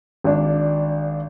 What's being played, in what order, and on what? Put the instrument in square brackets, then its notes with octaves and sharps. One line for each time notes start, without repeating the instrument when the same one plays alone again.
[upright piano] G#1 D4